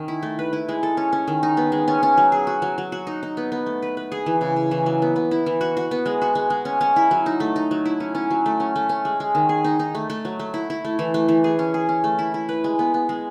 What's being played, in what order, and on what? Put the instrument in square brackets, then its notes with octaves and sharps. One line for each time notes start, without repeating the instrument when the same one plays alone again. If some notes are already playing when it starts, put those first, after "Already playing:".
Already playing: [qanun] D#3 C#4
E4
A3
B4
E4
G#3
A4
C#4
C#4
D#3
D#4
B3
G#3
C#4
C#4
F#3
G#4
F#4
F#3
F#3
F#4
D#4
D#4
B3
B3
A3
B4
B4
G#4
E3
C#3
C#3
E3
F#3
B3
B3
E4
E3
F#4
F#4
B3
G#3
F#4
G#3
G#3
C#4
C#4
E4
F#3
D#4
A3
D#4
F#3
E4
C#4
C#4
F#3
A3
C#4
A3
C#4
G#3
G#3
D#3
G#4
D#4
D#4
A3
A3
F#3
A3
E4
E4
A3
E3
A3
E3
G#4
C#4
G#4
C#4
A3
E4
E4
B4
G#3
B3
B3
G#3